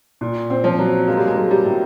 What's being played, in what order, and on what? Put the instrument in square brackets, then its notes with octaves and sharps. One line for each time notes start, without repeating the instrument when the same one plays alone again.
[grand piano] A#2
C4
[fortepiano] F3
[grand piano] F#3
[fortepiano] G#3 [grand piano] A#3
[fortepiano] G3
G#3
[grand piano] F#3
[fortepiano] G3
[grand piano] A2